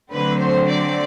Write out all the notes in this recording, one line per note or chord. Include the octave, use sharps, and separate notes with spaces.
D3 F#3 A3 C4 B4
C5
D5